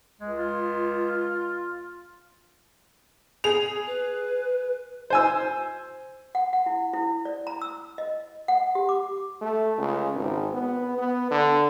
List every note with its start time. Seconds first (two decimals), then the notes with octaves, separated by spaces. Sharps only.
0.21 C#2 G#3
0.37 F4
3.44 G#4 F7
3.87 B4
5.10 C5 G#5 E6
6.35 F#5
6.53 F#5
6.66 E4
6.93 E4
7.25 D5
7.47 A#5
7.62 E6
7.98 D#5
8.48 F#5
8.75 G4
8.89 D6
9.41 A3
9.78 C#2
10.16 G#1
10.52 B3
10.98 B3
11.31 D3